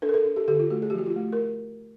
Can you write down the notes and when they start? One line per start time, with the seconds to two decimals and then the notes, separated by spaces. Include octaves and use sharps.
0.02 D4 A4 B4
0.09 A#4
0.14 A4 B4
0.25 D4
0.36 G4 A4
0.48 D3 G4 A4
0.60 F4
0.70 A3 F#4
0.82 G#4
0.90 G4
0.94 F3 F#4
1.06 F4 G4
1.16 A3
1.32 A#4